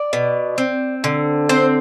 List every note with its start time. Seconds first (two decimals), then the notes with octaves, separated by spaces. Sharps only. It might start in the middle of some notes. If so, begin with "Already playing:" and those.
Already playing: D5
0.13 B2
0.58 C4
1.04 D3
1.49 C4 C5